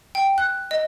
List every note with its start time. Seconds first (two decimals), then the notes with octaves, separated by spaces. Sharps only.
0.15 G5
0.38 F#6
0.71 D#5